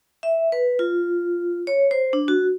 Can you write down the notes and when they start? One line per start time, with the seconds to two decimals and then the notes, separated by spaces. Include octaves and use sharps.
0.23 E5
0.52 B4
0.79 F4
1.67 C#5
1.91 C5
2.13 D4
2.28 F#4